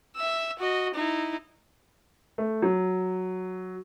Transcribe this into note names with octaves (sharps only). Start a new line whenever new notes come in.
E5 E6
F#4 D#5
D#4 E4
A3
F#3